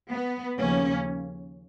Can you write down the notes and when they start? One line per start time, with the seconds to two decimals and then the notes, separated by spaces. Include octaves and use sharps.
0.11 B3
0.58 D#2 C#3 F3 A#3 C#4